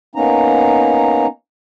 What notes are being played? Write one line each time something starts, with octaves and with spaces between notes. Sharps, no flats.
A#3 B3 C#4 D#4 A#5